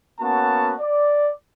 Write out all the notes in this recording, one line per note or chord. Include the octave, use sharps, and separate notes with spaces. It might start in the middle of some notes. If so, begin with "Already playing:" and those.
A#3 B3 C#4 F#4 A5
D5